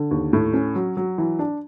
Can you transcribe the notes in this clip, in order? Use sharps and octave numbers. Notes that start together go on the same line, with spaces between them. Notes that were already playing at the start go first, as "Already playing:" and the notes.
Already playing: D3
D#2
A2
C#4
F#3
F#3
E3
D4